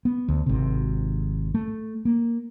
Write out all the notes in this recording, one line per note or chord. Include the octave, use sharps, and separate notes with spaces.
B3
D2
G#1 C3
A3
A#3